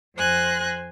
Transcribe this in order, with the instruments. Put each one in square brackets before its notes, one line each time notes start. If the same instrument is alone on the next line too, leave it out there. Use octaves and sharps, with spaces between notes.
[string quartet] F2 C5 G#5 F#6 A#6